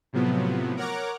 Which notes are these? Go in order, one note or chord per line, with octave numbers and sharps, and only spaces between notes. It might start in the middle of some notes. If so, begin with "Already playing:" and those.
A2 C3 F3 F#3 B3
A#4 C#5 F#5 A#5 D6